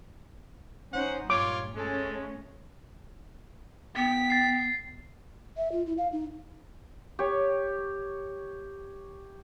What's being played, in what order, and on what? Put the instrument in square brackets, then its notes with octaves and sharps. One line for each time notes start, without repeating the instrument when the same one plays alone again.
[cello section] C#4 D#4 [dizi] C5 [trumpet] F#5
[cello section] G2 A#2 [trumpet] F4 [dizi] C#5 [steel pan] D6
[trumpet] G#3 [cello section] A3 C#4 [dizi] A4
[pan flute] B3 [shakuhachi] G5 [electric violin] B6
[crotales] A6 C7
[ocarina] E5
F4
E4
F5
D#4
[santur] G4 C#5